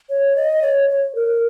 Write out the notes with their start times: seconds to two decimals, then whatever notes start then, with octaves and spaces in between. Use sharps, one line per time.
0.10 C#5
0.36 D#5
0.62 C#5
0.89 C#5
1.15 A#4